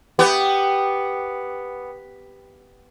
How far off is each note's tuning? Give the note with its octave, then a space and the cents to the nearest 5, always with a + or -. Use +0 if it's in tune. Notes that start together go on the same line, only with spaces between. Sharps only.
B3 +0 G4 +0